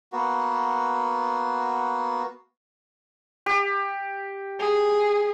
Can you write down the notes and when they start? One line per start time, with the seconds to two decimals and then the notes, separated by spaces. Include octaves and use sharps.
0.13 A#3 B3 F#4
3.46 G4
4.60 G#4